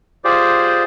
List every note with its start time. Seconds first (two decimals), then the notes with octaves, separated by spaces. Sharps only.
0.24 F4 G4 G#4 C5 D5